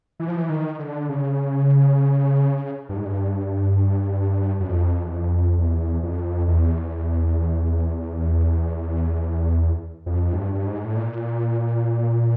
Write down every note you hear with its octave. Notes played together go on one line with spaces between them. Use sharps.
E3
F3
E3
D#3
D3
C#3
G2
G#2
G2
F#2
F2
E2
F2
E2
F2
E2
F2
G#2
G2
G2
G#2
A2
A#2